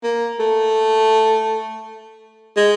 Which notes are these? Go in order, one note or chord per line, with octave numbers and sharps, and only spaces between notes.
A#3
A3
G#3